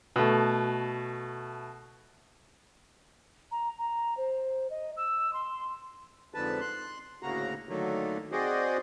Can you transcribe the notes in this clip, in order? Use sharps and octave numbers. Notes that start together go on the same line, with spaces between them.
B2 A3
A#5
A#5
C5
D#5
E6
C6
F2 G#2 D3 B4 A5
C6 F#6
D2 A2 C#3 A#3 F#4 A#5
D3 D#3 F#3 A3 A#3
C4 F#4 G#4 C5 D5 D#5